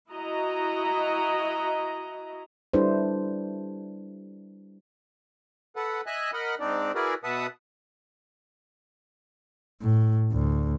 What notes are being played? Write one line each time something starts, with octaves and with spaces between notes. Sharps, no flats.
E4 F#4 D#5 A#5
G3 D4 E4 A4 B4 C5
A4 B4 F#5
D#5 E5 G#5 F#6
A#4 D#5 F#5 B5
G#2 C4 D4 D#4 D5
E4 F#4 G#4 A#4 B4 D5
B2 B4 E5 F#5 A5 D#6
A2
D2